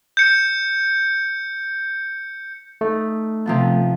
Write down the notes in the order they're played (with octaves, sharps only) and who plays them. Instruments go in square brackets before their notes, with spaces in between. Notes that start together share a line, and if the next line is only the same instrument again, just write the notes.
[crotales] G6 C#7
[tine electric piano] A3 [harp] D#4
[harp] C3 F3 B3